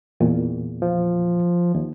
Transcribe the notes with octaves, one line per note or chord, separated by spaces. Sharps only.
E2 A#2
F3
D#2